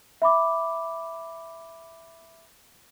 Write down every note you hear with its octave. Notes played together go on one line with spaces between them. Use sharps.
E5 B5 D6